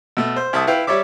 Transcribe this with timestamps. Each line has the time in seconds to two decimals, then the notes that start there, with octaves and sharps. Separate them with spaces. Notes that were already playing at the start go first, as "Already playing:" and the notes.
0.17 B2 A3
0.36 C5
0.53 C2 E5 A5 D#6
0.67 E4 B4 F5 G5
0.87 G3 C#5 D5 E5 D6